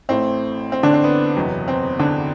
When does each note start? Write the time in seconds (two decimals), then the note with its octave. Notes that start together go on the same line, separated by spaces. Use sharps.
0.09 A1 A2 E3 A3 C4
0.72 C4
0.83 D3 D4
0.94 C4
1.04 B3
1.36 F#1 E2 C3 F#3
1.68 C4
2.00 D3 D4